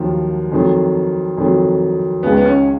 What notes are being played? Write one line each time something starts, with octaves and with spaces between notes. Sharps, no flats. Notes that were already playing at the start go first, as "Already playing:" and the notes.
Already playing: D#2 D#3 F3 F#3
F2 D#3 F#3
F2 D#3 F#3
C#2 C#3 G#3 B3 D#4 G#4
B3
C#4